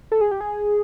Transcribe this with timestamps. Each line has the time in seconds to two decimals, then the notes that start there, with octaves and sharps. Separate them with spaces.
0.12 A4
0.21 G#4
0.31 G4
0.41 G#4